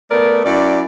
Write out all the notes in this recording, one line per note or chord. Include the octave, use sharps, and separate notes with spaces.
A3 B3 A#4 D5
F#2 E4 D5